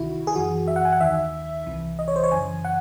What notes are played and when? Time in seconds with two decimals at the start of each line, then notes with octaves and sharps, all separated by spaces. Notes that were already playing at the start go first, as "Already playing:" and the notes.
Already playing: C#2 C3 D#3 E4 F#4
0.27 G#4
0.35 F#2 E3 F#4
0.68 E5
0.76 F#5
0.85 G#5
0.93 F#5
1.00 D#2 D#3 E5
1.66 C2 C3 E3
1.99 D#5
2.08 C#5
2.16 C5
2.24 C#5
2.32 F#2 C#3 E3 G#5
2.65 F#5